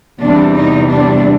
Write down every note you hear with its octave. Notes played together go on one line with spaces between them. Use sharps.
E2 C3 E3 G3 D4
D#4
D4